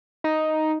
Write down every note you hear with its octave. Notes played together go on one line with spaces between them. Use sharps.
D#4